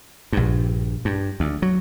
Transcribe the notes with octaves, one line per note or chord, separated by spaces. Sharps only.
A#1 G2
G2
D2
F#3